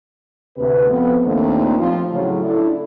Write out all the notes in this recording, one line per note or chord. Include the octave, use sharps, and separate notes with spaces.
D2 C3 B4
F2 B3
D#2 A#2 D#3 A3 C4 D4
F3 C4 F4
A2 C#3 F#3
D4 E4 A4